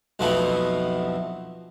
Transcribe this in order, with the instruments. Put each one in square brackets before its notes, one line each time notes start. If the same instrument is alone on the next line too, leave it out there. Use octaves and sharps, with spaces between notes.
[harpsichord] B1 F2 B2 E3 F3 A3